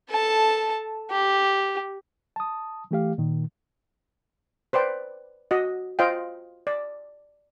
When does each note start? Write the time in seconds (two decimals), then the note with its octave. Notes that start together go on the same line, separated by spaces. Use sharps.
0.10 A4 A5
1.11 G4
2.36 A5 D#6
2.91 E3 A3 G4 F5
3.18 A#2 D#3
4.73 B4 C5 D5 G5
5.51 F#4 D#5
5.99 F4 C5 D#5 F5 G5
6.67 D5